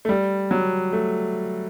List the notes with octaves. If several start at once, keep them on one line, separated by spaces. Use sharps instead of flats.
A3
G3
F#3
A3